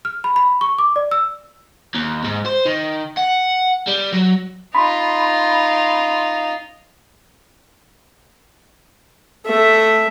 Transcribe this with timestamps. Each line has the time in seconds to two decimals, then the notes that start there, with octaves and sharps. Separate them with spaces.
0.05 F6
0.24 B5
0.36 B5
0.61 C#6
0.79 D6
0.96 D5
1.11 E6
1.95 D#2
2.25 G#2
2.46 C5
2.66 D#3
3.18 F#5
3.88 G3
4.13 F#3
4.75 D#4 F4 B5 C6
9.46 A3 E5